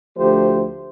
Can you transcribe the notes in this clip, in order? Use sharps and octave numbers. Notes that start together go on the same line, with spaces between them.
D2 F3 A3 G4 C5